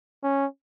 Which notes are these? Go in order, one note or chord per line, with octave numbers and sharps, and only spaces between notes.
C#4